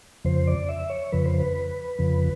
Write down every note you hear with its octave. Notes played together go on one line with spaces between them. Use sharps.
F2 C#3 F3 C5
D5
E5
C#5
F2 C#3 F3 B4
C5
B4
F2 C#3 F3